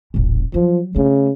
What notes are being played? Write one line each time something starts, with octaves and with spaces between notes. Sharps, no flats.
D#1 A1
F3 F#3
C#3 A3